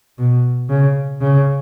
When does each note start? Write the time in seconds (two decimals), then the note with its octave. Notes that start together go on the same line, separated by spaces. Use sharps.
0.18 B2
0.69 C#3
1.21 C#3